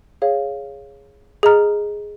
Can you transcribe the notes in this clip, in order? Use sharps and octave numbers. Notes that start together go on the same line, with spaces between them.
G#4 C#5 F5
G#4 D#5 A#5 F6